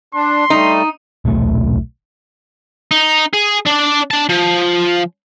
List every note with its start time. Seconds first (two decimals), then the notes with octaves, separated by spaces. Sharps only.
0.14 D4 C6
0.50 G3 A3 D#4
1.25 D#1 B1 A3
2.91 D#4
3.34 G#4
3.67 D4 D5
4.11 D4 A5
4.29 F3